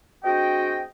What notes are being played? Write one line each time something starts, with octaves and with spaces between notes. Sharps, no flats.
G#3 C4 D4 F#4 D#5 G5